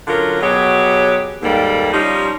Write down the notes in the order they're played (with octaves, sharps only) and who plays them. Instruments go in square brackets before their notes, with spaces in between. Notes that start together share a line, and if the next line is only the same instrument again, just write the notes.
[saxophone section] D3 F#3 C#4 F4 A#4
B2 F#3 G4 G#4 C#5
D#2 G#2 G3 A#3 A4
F3 G3 C#4 D#4